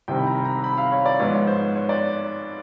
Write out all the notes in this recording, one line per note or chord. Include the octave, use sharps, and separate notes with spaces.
C2 C3 D#3 G3 C4 G5
B5
A#5
A#5
B5
F5
C#5
D5
G#2 F3 G#3 B3 C#5
C5
C#5
D5